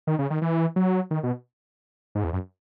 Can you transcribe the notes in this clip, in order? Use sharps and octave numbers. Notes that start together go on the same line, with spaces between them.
D#3
C#3
D#3
E3
F#3
D#3
B2
G#2
E2
F#2